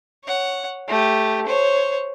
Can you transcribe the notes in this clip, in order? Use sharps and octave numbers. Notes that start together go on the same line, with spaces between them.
C#5 F#5
A3 G4
C5 C#5